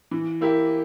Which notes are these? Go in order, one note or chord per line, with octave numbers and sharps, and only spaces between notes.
E3
A#3 E4 G4